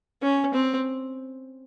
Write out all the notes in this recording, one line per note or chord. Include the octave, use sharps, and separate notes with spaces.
C#4
C4